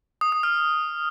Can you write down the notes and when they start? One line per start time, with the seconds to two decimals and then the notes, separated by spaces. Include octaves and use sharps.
0.21 D#6
0.32 D#6
0.43 F6